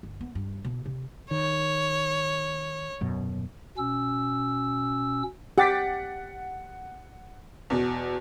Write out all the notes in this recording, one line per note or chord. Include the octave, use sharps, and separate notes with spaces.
G1
B3
G2
B2
C3
D#3 C#5
D#1 F#2 B2
B2 C#4 E6
G4 F#5 A6 B6
E2 B2